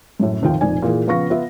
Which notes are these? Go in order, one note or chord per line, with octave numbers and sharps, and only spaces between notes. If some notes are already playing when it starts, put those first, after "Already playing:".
F#2 A2
F1 D#2 D#4 F4 G5
F1 F2 A#2 D#4 D5 G#5
A#2 E3 A#3 G#4 A#4
C#3 F3 B3 F5 C#6 A#6
B3 F4 E5